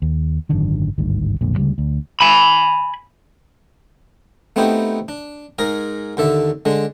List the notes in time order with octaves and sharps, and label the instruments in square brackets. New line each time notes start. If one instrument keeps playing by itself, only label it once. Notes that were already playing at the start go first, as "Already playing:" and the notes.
[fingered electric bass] D#2
G#1 F#2 D3 D#3
G#1 D2 G2 D#3
B1 F2 A#2 D3
D2 C#3 E3 G3
D2
[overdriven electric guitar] G#5 B5
[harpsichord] A3 B3 C4 D#4 E4 G4
D4
G#2 G#4 A#4 A#5
D#2 D3 A4 E5
D3 G#3 D4